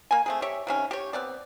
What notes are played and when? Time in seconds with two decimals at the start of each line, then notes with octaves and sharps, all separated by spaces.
0.11 A#3 G#5
0.26 A3 C4 G#4
0.42 G4 C#5 E5
0.67 C3 D#3 C#4
0.91 G4 C#5
1.13 B3 C4 D5